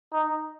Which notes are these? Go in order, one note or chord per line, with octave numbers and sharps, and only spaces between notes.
D#4